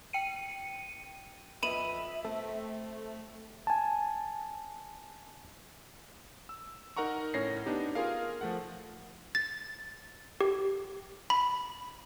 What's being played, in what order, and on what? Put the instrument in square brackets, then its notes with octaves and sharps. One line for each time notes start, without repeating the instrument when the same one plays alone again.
[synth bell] G5 C#7 D#7
[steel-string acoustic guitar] F2 B4 D#5 [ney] E5 [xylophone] B5 D#7 F#7
[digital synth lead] A3 [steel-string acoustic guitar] C4
[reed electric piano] G#5 A5
[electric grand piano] E6
D#4 A#4 F#5 A#5 C#6
A2 C#4 C#5 A#6 C7
B3 D4 D#4 G4
F4 G#4 A#4 F5
F3 A3 F#5
[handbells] A6
G4
B5